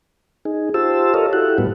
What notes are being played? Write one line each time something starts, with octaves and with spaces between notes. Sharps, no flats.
D#4 G#4
F4 G4 C5 A5 E6
A4 A#4 C#5 D#5 F5
E4 F#4 G4 A4 F#5
A2 G3 B3 B4